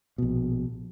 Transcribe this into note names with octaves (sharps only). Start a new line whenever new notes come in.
A#1 B2